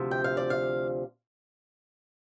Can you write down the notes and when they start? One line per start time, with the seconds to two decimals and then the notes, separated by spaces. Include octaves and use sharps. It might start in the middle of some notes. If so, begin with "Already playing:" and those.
Already playing: D2 C3 F3
0.11 G5
0.24 F5
0.37 D5
0.50 F5